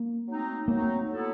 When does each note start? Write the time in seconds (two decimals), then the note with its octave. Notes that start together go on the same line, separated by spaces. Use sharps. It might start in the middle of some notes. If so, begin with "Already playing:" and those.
Already playing: A#3
0.27 F#3 A3 C4 D#4
0.68 F#3 A3 A#3 C4 D#4
1.09 F#3 B3 E4 A4